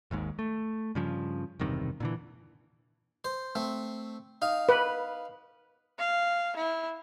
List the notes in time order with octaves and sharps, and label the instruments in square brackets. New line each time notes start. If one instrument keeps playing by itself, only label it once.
[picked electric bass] G#1 D#2 G#2
A3
G2 C#3 F3
E1 G2 C3 D#3
A#2 D3 E3
[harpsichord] C5
A3 C4
D#4 F5
[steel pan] B4
[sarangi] F5
E4